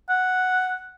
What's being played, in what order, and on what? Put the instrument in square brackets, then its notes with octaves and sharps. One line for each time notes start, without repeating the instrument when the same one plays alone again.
[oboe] F#5